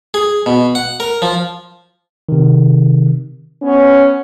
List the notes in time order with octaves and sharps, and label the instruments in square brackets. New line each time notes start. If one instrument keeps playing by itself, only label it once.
[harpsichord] G#4
B2
F#5
A#4
F3
[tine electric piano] C3 D#3
[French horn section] B3 C#4